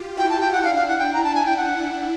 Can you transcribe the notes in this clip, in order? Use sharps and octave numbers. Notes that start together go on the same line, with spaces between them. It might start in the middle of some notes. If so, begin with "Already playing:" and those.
Already playing: F4 G4
E4 F#4 G5
A5
G5
F#5
D4 E4 F5
F5
F#5
G5
A#5
A5
G#5
G5
F#5